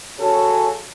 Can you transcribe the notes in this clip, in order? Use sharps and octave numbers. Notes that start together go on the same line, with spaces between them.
C#3 F#3 C#4 A4